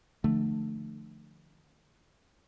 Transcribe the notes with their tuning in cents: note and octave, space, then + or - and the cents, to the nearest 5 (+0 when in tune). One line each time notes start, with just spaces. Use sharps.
D3 +25 F3 +0 A3 +0